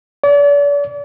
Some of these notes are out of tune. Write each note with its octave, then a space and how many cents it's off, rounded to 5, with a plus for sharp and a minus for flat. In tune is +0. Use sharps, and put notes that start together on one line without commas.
D5 -40